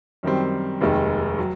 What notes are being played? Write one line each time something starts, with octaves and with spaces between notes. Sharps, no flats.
F#2 D#3 G3 C4
F1 D#2 D#3 G#3
F#3